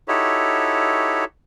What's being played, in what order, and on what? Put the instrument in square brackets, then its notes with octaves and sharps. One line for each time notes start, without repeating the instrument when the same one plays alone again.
[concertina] D#4 E4 F#4 G4 A4 C#5